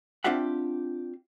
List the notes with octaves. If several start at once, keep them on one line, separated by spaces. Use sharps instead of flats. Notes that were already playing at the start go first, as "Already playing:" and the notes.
C4 D4 F4 G4 E5 F#5